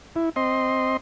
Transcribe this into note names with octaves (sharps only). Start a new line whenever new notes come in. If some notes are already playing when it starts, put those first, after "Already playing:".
E4
C4 D#5 C6